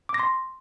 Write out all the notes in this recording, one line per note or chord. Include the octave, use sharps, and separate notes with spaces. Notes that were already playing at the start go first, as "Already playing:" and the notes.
D6
A#6
C6